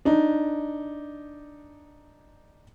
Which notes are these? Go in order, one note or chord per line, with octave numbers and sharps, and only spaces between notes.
D4 D#4